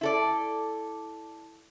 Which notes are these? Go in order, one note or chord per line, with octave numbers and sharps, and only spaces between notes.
E4 A4 D5